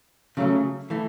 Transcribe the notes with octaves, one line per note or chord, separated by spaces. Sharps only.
C#3 F#3 A3
E3 A3